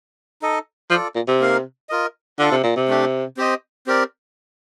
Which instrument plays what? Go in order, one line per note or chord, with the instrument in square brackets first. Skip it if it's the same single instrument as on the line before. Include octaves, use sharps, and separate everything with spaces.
[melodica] D#4 A4 D#5
[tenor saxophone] F3 [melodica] F4 A4 D5
[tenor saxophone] A#2
C3
[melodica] A#3 D#4 A#4 F5
F4 A#4 D#5
[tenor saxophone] D3 [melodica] D4 F4 A4
[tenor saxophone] C3
A#2
C3
[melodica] A3 D4 G4
C4 G4 C5 D#5
C4 G4 A#4 D5